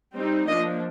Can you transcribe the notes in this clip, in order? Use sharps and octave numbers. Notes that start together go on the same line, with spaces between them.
G3 C4 D#4
F3 A#3 D4 D#5